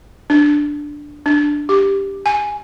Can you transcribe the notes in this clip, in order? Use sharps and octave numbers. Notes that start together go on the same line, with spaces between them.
D4
D4
G4
G#5